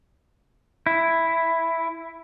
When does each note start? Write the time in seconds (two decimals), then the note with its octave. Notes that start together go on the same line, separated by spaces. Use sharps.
0.86 E4